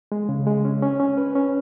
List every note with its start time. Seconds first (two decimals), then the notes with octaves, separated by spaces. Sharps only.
0.12 G#3
0.29 C#3
0.47 G#3
0.65 C#4
0.83 C#4
1.00 C#4
1.17 B4
1.35 C#4